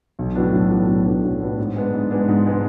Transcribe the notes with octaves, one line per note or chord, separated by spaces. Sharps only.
B1
A2 F#3 B3 D4
B1
A2 F#3 B3 D4
B1
A2 F#3 B3 D4
B1
A2 F#3 B3 D4
G#2
G#3 B3 D4
G#2
G#3 B3 D4
G#2
G#3 B3 D4